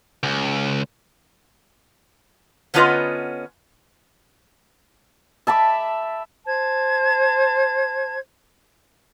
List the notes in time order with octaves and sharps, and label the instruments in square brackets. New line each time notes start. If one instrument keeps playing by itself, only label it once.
[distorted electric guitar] C#2
[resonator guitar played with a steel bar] D3 B3 C#4 F4 B4 D#5
[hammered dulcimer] E5 A5 B5 D6
[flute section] C5 A5 G#6